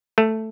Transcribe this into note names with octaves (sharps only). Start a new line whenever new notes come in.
A3